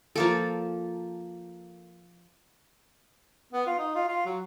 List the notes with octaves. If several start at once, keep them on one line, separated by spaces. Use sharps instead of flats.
F3 A#3 A4
B3
F4
D#4
F4
F4
F#3